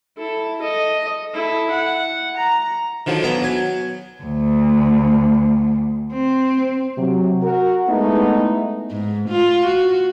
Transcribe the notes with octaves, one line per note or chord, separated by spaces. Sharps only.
E4 A4
A4 D#5
E4 A4
F#5
A#5
D3 D#3 F3 F#3
E3 B3 A#5
F#3 G#5
D2
C4
C3 F#3
F#4 A#4
G#3 A3 B3 D#4 E4
G#2
F4
F#4